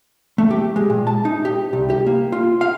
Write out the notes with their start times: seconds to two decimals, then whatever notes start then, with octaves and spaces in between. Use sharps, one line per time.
0.38 A3
0.50 G4
0.76 G#3
0.90 A#2
1.07 A5
1.25 D#4
1.45 G4
1.73 C2
1.90 G4
2.06 A#3
2.32 F4
2.61 F5